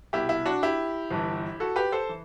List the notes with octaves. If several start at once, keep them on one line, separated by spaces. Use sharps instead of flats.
C2 B2 E4 G4
E4
D4 F#4
E4 G4
G1 G2 E3
F#4 A4
G4 B4
A4 C5
E3